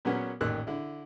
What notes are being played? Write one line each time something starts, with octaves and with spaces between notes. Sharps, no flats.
A#2 F#3 A#3 B3 C#4
A1 A#2 D#3 E6 F#6
D3 E4